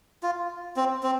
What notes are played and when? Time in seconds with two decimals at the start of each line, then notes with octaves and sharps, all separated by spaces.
0.23 F4
0.76 C4
1.03 C4